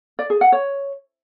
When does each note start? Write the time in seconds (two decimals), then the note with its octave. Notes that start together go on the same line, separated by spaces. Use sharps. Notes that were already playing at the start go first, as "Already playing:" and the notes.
0.19 D5
0.30 G#4
0.41 F#5
0.52 C#5